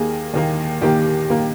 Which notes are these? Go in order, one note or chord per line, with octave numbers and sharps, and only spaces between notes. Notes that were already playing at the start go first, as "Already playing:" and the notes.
Already playing: D#2 D#3 A#3 G#4
D#2 D#3 A#3
D#2 D#3 A#3 G4
D#3 A#3